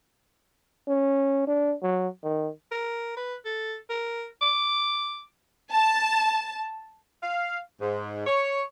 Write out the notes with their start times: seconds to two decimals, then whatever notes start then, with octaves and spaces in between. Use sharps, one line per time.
0.88 C#4
1.47 D4
1.82 F#3
2.23 D#3
2.72 A#4
3.17 B4
3.45 A4
3.90 A#4
4.41 D6
5.73 A5
7.23 F5
7.81 G#2
8.27 C#5